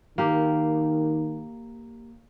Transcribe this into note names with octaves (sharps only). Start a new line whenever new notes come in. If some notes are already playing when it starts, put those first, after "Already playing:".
D#3 A#3 G4